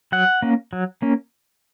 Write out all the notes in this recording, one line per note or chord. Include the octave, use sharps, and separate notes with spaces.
F#3 F#5
A#3 C#4
F#3
A#3 C#4